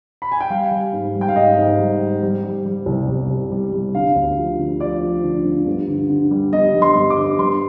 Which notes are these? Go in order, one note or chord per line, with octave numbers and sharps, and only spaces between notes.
B5
G#5
G5
G3 F5
G3
G#2
G3
G5
F5
G#2 D#5
G#2
G3
G3
G3
G3
G3
C2
C2
C2
G3
G3
D3 F5
D2
F3
D3
F3 D5
F3
D3
D3
G2
D3
D3
G3
G2 D#5
G2
C6
G2
D6
D3
G2 C6